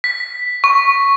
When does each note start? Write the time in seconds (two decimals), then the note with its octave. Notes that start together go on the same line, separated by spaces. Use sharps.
0.04 B6
0.64 C#6